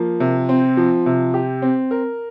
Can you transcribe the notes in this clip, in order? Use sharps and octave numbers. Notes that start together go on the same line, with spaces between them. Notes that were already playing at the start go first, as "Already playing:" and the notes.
Already playing: F3 A#3
C3
C4
F3
C3
G4
C4
A#4